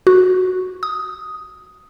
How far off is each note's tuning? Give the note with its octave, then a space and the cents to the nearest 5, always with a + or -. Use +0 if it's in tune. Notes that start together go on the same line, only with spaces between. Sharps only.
F#4 -5
D#6 +5